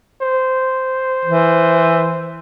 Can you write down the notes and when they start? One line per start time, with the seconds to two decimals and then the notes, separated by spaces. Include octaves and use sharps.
0.22 C5
1.25 E3